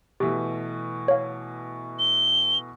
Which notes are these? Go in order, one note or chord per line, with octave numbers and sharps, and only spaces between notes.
B2 E3 A3 G4
C#5 F5
G7